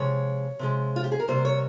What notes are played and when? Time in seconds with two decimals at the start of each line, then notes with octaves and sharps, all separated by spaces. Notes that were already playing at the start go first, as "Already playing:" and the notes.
Already playing: C3 F3 G#3 C#5
0.59 C3 F3 G#3
0.96 F4
1.04 G4
1.12 G#4
1.20 A#4
1.28 C3 G3 A#3 C5
1.45 C#5